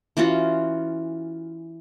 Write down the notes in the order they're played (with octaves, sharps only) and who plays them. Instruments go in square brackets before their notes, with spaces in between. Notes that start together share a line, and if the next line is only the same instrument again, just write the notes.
[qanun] E3 C#4 F4 F#4